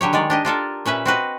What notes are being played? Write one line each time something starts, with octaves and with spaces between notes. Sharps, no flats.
D3 F#3 G4 C#5
D#3 G#3 C#5 D5
D4 G4 D#5
D4 F4 A4 A#4
A#2 C#4 B4 E5
C4 F#4 B4 D#5